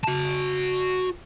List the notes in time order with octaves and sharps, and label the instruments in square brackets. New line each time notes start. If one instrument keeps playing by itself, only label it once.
[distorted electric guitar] F#4 A5